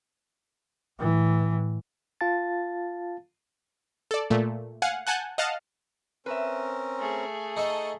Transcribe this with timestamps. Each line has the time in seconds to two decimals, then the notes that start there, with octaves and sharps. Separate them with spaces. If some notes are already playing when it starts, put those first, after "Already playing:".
0.99 A2 E3
2.21 F4 F5 A5 A6
4.11 A4 D5
4.30 A#2 A3
4.82 F5 F#5 G#5
5.07 F#5 G#5 A5 F#6 G6
5.38 D#5 F5 F#5 A5 F6
6.26 C4 C#4 A#4 B4 E5
6.99 A3 G#4
7.57 D#4 A4 D#5 A5 C#6 D#6